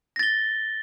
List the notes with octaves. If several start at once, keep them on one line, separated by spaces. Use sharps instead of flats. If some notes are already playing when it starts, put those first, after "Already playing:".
A6 A#6 G7